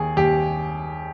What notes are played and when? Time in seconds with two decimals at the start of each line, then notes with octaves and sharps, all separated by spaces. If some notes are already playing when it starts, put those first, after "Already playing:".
Already playing: D#2 G#4
0.17 D#2 G4